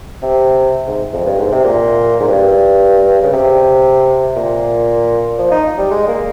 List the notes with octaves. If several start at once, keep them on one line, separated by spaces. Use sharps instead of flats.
C3
G#2
F2
G2
G#2
C3
A#2
G#2
G2
C#3
C3
A#2
F3
D#4
G3
G#3
A#3